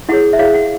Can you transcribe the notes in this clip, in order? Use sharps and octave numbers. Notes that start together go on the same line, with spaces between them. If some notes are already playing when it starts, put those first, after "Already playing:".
E4 G#4 C#5 F#5
E5
E4 G#4 C#5 F5
F#5